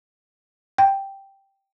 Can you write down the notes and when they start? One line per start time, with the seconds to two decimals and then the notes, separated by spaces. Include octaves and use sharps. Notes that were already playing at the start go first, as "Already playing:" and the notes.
0.78 G5